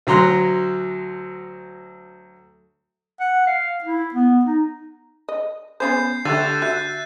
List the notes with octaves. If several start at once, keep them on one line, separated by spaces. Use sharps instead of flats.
D2 F#3 A#5 C6 F#6
F#5
F5
E4
B3
D#4
D#5
B3 C#4 C5 G6 G#6 C7
D3 A3 G4 E5 F#6 A6 D#7
F#4 E5 F#6